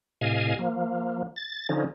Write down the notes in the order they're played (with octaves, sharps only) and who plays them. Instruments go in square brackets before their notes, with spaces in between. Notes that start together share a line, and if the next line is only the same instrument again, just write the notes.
[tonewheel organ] A2 C3 D#5 F5 G#5
F3 A#3
A6
D3 F3 C#4 D#4